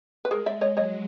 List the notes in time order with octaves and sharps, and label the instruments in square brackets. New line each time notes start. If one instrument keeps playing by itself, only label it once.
[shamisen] B4
[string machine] G#3 [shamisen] G#4 A#4
[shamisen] D5 E5
C#5 D#5
[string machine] F#3 [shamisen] C#5 D#5